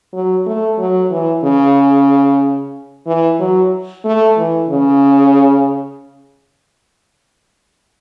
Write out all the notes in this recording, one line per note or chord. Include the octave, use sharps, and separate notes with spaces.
F#3
A3
F#3
E3
C#3
E3
F#3
A3
E3
C#3